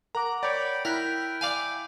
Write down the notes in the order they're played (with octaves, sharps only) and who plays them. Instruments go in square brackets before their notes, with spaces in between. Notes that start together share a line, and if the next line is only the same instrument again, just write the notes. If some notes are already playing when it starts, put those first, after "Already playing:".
[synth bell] A#4 F#5 D6 [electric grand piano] A#5
[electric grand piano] C#5 D5 [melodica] G5 B5
[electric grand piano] E4 [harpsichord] A#4 [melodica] G5 [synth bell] F6 F#6 B6
[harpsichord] D5 F5 G#5